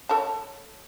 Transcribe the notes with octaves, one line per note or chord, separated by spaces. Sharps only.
A4 C#5 A5